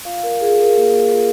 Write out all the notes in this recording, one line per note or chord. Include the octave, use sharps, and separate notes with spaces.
F4 F5
A#4
F4 G#4
A#4
A#3
F4